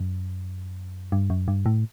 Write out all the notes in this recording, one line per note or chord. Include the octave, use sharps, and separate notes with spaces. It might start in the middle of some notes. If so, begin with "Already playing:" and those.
Already playing: F#2
G2
F#2
G2
A2